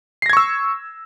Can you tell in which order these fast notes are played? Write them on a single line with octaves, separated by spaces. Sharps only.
C7 A#6 G#6 C#6 E6